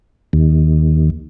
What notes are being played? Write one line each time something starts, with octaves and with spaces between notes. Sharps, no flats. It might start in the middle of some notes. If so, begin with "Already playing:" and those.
D#2